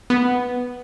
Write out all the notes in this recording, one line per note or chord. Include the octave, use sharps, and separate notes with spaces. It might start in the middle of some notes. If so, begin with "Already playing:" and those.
B3